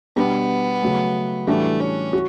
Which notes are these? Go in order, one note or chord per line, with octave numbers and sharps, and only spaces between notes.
B2 G3 B3 D4
C#3 F#3 A3
A2 E3 G3 A3 D4 F#4
C#4
F#4